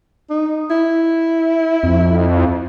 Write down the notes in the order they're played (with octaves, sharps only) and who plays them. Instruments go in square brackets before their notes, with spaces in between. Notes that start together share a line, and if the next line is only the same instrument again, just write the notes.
[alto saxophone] D#4
E4
[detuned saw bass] F2